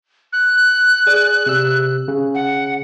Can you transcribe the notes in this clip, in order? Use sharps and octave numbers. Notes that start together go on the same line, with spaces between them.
F#6
G#4 D5
C3 E6
C#3
F#5